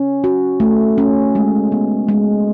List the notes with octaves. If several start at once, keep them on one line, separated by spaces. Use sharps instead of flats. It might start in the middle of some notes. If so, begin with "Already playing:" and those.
Already playing: C#4
F#4
A3
C#4
G#3
B3
G#3